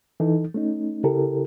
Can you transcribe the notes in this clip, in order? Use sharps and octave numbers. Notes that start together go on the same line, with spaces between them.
E3 D#4 A4
A3 C#4 D#4
C#3 E4 G4 A4 A#4